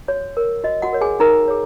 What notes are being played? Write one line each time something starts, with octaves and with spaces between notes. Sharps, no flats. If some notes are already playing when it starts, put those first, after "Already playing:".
F#4 C#5
A#4 C#5
F#4 D#5
F#4 F#5
A#4 C#5
G#4 G#5
D#4 A#4 A#5
G#4 C#5